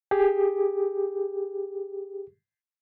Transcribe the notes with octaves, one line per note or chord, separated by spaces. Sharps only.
G4 G#4